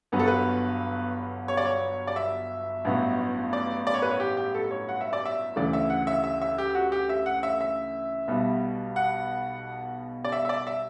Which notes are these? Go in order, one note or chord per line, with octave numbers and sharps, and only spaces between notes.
G1 G2 F#3 B3 B4
A4
B4
C#5
D5
C#5
D5
E5
A1 G2 F#3 B3
D5
D5
C#5
B4
C#5
G4
G4
A4
C#5
F#5
E5
D5
E5
D2 C#3 E3 A3 D5
E5
F#5
E5
E5
E5
G4
F#4
G4
E5
F#5
E5
E5
B1 B2 G3 B3
F#5
D5
E5
E5
D5
E5